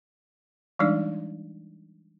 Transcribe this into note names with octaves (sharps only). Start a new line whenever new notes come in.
E3 G3 G#3 D4 D#4 D5